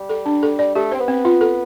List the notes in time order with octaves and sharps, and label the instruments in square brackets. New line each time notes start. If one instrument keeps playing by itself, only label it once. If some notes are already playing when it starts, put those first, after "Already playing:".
Already playing: [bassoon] G3
[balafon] A4
D4
A4
D5
[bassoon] A3 [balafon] G4
[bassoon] C4 [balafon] C5
[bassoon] B3
[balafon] C4
F4
A4